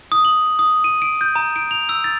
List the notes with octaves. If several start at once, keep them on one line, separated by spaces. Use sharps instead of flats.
D#6
F#7
D#6
D#7
D7
G6
A#5
D7
F7
E6
A6